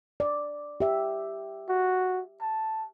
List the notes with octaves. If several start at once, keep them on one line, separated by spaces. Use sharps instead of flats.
D5
G4 E5
F#4
A5